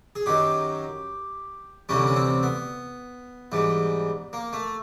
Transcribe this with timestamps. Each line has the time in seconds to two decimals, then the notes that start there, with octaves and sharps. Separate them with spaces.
0.16 G#4
0.26 F#2 D#3 F#3 G4
1.89 D2 C3 E3 G3 C#4
2.07 C#4
2.16 C4
2.43 B3
3.52 G#2 E3 G3
4.33 A#3
4.53 A3